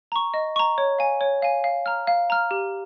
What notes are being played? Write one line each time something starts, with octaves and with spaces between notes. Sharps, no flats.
A#5 C#6
D#5
A#5 C#6
C#5
F5 G#5
C#5
F5 G#5
F5
A#5 F6
F5
A#5 F6
G4